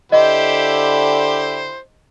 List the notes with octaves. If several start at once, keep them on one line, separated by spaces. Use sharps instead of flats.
D3 E4 G4 C5 D#5